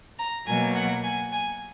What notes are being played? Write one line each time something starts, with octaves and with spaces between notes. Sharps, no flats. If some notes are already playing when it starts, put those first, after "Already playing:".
A#5
B2 F#3 A#3 G#5
F#5
G#5
G#5